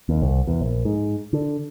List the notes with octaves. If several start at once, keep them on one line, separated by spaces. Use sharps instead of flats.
D#2
C2
E2
A#1
G#2
D3